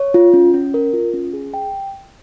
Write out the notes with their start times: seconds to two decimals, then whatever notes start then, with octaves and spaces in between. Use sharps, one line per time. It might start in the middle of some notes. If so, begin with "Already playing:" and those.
Already playing: C#5
0.14 F4
0.34 C#4
0.54 C#4
0.74 A#4
0.93 F4
1.13 C#4
1.33 G#4
1.54 G5